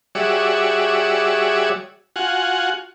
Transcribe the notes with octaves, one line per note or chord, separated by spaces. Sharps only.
G3 F#4 G#4 C#5 D5 E5
F4 F#4 F#5 G#5